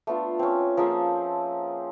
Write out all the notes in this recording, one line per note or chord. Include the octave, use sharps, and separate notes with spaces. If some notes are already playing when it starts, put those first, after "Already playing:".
A3 B3 D4 F4
C4 C#4
F3 A#3 G#4 E5